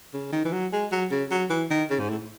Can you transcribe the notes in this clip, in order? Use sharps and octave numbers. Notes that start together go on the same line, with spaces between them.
C#3
D#3
E3
F#3
G#3
F#3
C#3
F#3
E3
D#3
C#3
G#2
A2